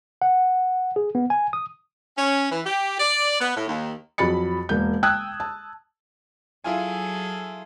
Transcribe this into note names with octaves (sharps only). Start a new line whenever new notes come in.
F#5
G#4
B3
G#5
D#6
C#4
E3
G4
D5
B3
A2
D#2
F2 F#3 G#4 B5 A6 C#7
E1 A#3 G6
G5 A5 D#6 E6 F#6 G#6
A5
F#3 E4 F4 G#4 A4 G#5